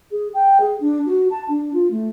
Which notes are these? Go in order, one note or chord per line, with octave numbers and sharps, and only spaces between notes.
G#4
G5
G#4
D4
F#4
A5
D4
F4
A3